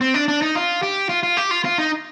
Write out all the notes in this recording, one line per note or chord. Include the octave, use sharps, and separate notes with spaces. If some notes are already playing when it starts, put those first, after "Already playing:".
C4
D4
D4
D#4
F4
G4
F4
F4
G4
F4
F4
D#4